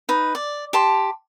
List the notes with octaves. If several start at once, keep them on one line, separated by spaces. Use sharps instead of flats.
D#4 B4
D5
G4 A5 C6